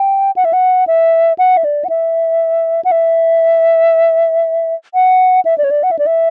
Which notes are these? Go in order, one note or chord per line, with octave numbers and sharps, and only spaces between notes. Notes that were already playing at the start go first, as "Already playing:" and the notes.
Already playing: G5
F#5
E5
F#5
E5
F#5
E5
D5
F#5
E5
F#5
E5
F#5
E5
D5
C#5
D5
F#5
E5
D5
E5